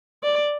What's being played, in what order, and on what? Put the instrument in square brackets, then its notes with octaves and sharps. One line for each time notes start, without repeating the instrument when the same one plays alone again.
[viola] D5